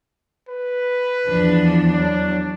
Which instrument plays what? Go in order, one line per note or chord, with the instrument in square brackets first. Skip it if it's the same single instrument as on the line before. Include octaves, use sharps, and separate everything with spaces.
[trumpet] B4
[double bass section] E2 [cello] F3 D4
[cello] F#3 [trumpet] D4